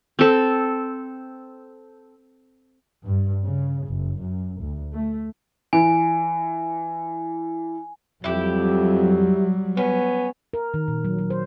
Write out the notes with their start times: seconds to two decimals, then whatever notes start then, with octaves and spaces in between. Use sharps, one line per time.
0.19 C4 A4
3.04 G2
3.45 C#3
3.87 F#1
4.20 F#2
4.61 D2
4.93 A3
5.73 E3 G#5
8.24 F2 F#3 G3 E4 G4
9.77 B3 C#4
10.53 A#4
10.74 D#3
10.88 A#2
11.05 F#3
11.19 F#3
11.30 C5